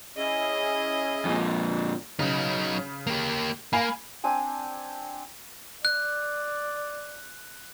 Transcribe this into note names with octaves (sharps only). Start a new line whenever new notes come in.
C#4 E4 G#4 D#5
F2 A#2
C#3 F#3 D#4
A#3 G4
A#3 F5 G#5 B5
C4 D4 G#5
D5 F#6